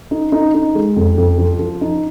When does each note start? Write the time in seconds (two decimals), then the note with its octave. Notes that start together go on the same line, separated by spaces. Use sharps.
0.11 D#4
0.32 D#4
0.54 D#4
0.75 G#3
0.96 F2
1.18 F2
1.38 F3
1.59 F3
1.81 D#4